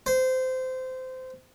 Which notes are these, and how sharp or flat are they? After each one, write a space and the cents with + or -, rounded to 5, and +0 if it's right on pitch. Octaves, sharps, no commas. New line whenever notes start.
C5 -20